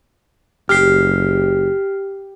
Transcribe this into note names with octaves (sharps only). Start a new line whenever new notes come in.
F#1 G4 F6 C7